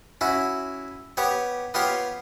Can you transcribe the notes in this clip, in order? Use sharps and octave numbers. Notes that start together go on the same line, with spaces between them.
C#4 E4 F#4
B3 G4 C#5
B3 F4 G4 C#5 C6